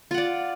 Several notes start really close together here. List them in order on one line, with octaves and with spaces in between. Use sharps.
F4 F#5 D5